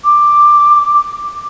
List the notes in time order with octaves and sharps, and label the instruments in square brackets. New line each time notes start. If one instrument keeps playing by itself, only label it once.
[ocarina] D6